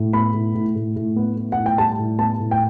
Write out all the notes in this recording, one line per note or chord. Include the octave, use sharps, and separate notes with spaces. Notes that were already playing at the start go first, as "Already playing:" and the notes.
Already playing: A2
B3 B5
A2
A2
A2
A2
B3
B3
F#5
A2
G5
G3 A5
A2
B3 A5
A2
G5